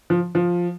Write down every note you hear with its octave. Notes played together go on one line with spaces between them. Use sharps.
F3
F3